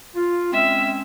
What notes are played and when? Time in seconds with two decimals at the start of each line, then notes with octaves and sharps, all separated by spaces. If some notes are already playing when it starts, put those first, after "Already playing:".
0.15 F4
0.53 G#3 C4 C#4 E5